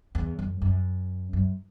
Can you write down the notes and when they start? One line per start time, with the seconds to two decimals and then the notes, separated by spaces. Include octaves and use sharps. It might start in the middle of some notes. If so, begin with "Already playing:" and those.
0.15 E2
0.39 F#2
0.62 F#2
1.33 F#2